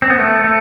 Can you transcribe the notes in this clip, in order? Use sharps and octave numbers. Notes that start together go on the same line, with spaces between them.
C4
B3
A3
A3